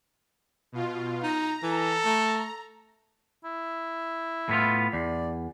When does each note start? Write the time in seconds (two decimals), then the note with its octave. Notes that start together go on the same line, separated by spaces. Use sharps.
0.72 B2 F4
1.23 D#4 A#5
1.63 E3 A4
2.05 A3
3.44 E4
4.49 A2 B3 F4
4.93 E2 D5